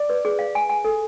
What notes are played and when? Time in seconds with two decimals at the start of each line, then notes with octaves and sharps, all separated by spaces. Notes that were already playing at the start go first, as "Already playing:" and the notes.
Already playing: D5
0.10 B4
0.25 G#4
0.39 F5
0.55 G#5
0.70 G#5
0.85 A4